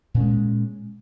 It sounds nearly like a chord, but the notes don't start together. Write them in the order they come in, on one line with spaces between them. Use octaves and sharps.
A#2 C#4 G#3